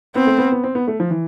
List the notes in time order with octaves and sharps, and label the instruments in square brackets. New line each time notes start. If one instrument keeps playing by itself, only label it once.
[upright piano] B3 [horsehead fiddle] C4
[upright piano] A3
B3
B3
C4
B3
A3
F3
E3